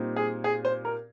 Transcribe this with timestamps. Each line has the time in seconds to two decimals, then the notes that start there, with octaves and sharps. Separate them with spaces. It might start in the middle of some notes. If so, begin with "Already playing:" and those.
Already playing: A#2 G3 C4 D#4
0.16 G#4
0.44 G#4
0.65 C5
0.85 A#4